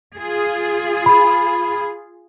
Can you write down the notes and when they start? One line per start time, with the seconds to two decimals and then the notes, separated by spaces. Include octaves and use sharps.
0.17 F4 G#4
1.06 B5